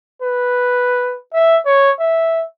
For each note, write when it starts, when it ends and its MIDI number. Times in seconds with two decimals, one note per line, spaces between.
0.22 1.18 71
1.34 1.57 76
1.66 1.91 73
2.00 2.44 76